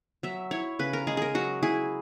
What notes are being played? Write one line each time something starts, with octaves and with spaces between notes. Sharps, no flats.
F#3 E5
E4 C#5
C#3 B4
A#4
G#3 G#4
G#4 A#4
F#3 F#4
E4 G#4